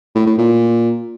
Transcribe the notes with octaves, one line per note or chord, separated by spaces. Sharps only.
A2
A2
A#2